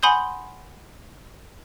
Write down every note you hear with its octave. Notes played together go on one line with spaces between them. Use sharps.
F#5 G#5 B5 C6 D#6 G6